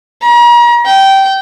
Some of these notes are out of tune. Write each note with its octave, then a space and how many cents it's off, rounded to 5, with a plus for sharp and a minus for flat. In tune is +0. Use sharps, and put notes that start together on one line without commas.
A#5 +40
G5 -15